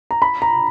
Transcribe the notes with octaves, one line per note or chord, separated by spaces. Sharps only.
A#5
B5
A#5